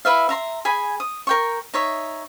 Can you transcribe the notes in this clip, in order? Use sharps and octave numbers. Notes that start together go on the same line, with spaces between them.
E4 B4 E5 F5
E5 A#5 C6
G#4 G#5 B5
D#6
A#4 G5 C#6
D#4 C#5 E5